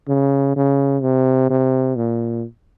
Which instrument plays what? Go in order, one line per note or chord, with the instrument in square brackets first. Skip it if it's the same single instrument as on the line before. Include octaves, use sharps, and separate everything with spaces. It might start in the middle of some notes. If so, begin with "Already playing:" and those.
[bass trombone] C#3
C#3
C3
C3
A#2